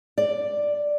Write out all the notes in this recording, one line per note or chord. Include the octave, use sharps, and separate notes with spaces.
D5